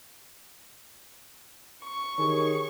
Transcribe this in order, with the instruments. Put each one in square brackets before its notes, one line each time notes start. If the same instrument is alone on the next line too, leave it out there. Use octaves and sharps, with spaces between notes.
[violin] C#6
[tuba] D#3 [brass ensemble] G4 G#4 C#5